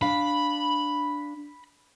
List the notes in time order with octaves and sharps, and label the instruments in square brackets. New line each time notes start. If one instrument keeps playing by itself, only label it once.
[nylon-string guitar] D4 F5 [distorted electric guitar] B5